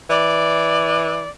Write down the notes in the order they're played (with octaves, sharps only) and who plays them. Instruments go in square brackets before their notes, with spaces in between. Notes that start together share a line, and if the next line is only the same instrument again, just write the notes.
[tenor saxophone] E3 [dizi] D5